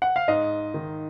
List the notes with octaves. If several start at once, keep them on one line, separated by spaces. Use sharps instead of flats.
F#5
F5
G#2 D#5
D#3